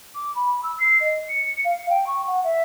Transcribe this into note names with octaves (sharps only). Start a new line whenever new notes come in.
D6
B5
E6
C7
D#5
C#7
F5
G5
C#6
F#5
E5